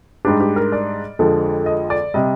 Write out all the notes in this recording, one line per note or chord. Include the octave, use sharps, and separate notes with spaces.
G#2 G3 D4 G4
G4
A#4
D5
F2 D3 F3 G#3
D#5
D5
C3 G3 D#5